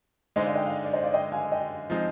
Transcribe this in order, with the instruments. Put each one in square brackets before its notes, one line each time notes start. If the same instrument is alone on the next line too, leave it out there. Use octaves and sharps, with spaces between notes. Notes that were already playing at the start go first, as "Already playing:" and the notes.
[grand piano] D3 G#3 D#4 [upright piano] C5 D#5
[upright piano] D5 F5
D#5 G5
D5 F5
D5 F5
C5 D#5
D5 F5
D#5 G5
F5 G#5
D#5 G5
[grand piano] F3 G#3 C4 D#4